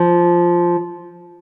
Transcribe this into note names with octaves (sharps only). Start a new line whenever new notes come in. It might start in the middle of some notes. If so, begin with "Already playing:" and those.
Already playing: F3